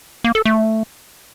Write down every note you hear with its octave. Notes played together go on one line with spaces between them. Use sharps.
A#3
A4
A3